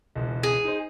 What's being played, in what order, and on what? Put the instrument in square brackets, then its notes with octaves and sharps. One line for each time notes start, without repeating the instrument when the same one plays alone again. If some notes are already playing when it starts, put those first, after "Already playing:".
[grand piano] E1 C#2
[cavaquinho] G#4
[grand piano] D#4 C5